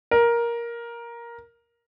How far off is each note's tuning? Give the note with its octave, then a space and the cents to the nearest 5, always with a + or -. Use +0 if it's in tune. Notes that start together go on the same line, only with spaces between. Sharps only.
A#4 +10